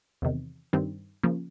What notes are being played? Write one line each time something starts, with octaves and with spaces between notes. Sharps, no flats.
E2 C3 D#3
G2 D#3 G3 C4
C#3 F3 A#3